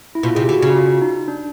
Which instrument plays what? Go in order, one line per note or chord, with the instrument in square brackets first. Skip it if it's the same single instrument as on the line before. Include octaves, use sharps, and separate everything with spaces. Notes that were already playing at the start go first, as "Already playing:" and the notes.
[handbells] E4
[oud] B2 [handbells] F4
[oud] C3 [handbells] G#4
[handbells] G4
[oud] D3 [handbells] F#4
[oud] C#3
[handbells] F#4
F4
D#4
D4